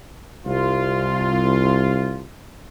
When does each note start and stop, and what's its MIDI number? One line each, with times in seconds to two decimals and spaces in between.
0.45 2.24 36
0.45 2.24 65